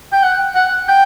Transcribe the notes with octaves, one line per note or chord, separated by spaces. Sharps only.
G5
F#5
F#5
G5